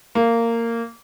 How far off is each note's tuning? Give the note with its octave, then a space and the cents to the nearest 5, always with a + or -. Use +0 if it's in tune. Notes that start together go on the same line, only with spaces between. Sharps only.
A#3 -15